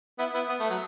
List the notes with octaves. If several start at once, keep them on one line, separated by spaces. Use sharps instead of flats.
B3 E4
B3 E4
B3
A3
F#3